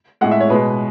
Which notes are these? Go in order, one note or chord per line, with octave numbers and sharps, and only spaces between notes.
A2 G#3 F#5
E5
C#5
B2 G#3 B4